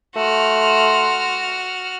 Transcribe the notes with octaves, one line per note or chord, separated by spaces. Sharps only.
A3 F#4 C6 F6